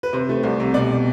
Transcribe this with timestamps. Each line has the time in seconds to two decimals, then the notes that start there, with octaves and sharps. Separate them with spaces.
0.03 B4
0.13 C3 C5
0.29 A3
0.43 C2
0.60 C3
0.74 B2 D5